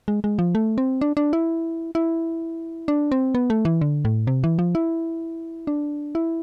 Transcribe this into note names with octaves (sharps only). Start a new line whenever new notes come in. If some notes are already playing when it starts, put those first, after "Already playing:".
G#3
G#3
F3
A3
C4
D4
D4
E4
E4
D4
C4
B3
A3
E3
D3
A2
C3
E3
F3
E4
D4
E4